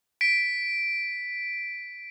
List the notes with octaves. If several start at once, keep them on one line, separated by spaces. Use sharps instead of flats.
B6 D7